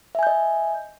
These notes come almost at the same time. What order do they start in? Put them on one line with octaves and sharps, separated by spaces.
E5 G#5 G6 D#5